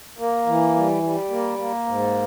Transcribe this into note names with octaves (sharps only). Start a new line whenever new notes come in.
A#3
E3
G3
G3
A#3
A#3
G#2